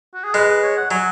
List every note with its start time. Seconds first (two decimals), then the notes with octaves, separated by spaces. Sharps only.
0.14 F#4
0.24 G#4
0.34 G#3 B4
0.49 B4
0.63 C#5
0.77 F#5
0.91 F#3 G#5